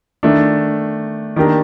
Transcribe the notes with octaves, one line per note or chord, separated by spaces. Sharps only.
D#3 A3 D4
D#3 A#3 D4 G4 A#4